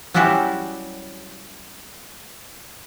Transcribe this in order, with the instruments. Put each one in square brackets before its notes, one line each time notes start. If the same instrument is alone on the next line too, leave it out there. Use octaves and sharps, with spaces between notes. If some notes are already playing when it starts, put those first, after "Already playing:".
[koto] F#3 G3 C#4 E4 F#4 G4